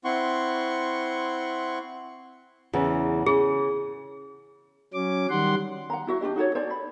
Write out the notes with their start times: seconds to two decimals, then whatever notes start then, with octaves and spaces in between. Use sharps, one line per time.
0.05 C4 E4 F#5 C6 C#6
2.73 E2 C#3 E3
3.26 C#3 G#4
4.93 F#3 C#4 D6
5.30 D#3 G3 F#5 C6
5.90 F#5 A#5
6.07 E4 F#4 E5
6.21 D4 F#4 G4 D#5
6.36 D#4 F#4 A4 C#5
6.55 C5 D5 A5
6.70 B5